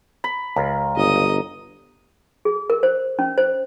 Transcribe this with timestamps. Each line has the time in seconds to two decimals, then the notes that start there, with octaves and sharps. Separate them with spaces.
0.24 B5
0.56 C#2 A#4
0.96 G1 D#5 D#6
2.45 G#4
2.70 A#4
2.83 C5
3.19 C#4
3.38 C5